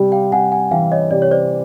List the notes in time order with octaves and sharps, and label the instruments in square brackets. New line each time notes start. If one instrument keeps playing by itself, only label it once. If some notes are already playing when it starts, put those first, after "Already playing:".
Already playing: [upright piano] C3 G3
[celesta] F5 G5
[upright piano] C3 [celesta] F#5 G#5
[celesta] F#5 G#5
[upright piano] E3 [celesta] F5 G5
[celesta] C#5 D#5
[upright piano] C3 [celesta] D5
[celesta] C#5
C5 D5